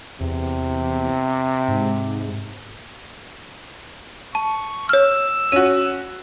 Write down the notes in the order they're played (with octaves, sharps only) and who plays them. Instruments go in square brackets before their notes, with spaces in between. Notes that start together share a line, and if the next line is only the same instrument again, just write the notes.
[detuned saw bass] E2 [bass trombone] C3
[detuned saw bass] G#2
[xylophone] A5 [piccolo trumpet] C#6
[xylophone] C#5 F6 [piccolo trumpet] E6
[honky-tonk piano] C#4 F#4 [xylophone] D#7